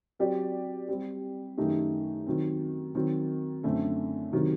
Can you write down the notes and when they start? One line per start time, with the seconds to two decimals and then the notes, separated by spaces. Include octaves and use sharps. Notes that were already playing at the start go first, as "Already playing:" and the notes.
0.19 F#3 C4 G4 D5
0.88 G3 C4 G4
1.57 F#2 D#3 A3 D#4 G4
2.26 D#3 F#3 C4
2.95 D#3 F#3 C4
3.63 F#2 D3 A3 C4
4.33 C3 D#3 F#3